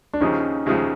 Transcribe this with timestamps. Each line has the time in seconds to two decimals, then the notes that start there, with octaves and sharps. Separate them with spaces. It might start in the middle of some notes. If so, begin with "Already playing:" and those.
0.13 D4
0.21 D#2 C#3 F3 C#4 D#4
0.66 D#2 C#3 F3